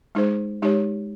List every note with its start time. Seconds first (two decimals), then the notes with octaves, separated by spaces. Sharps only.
0.15 G#3 D#4 G#4 C5
0.62 G#3 D#4 G4 C#5